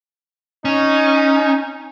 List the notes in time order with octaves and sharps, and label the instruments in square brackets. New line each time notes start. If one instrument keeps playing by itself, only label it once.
[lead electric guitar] C#4 [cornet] D#4